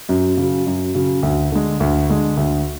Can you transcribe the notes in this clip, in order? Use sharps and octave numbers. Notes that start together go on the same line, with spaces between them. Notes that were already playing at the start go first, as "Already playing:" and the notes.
F#2
C#3 F#3
F#2
C#3 F#3
D2
D3 G#3
D2
D3 G#3
D2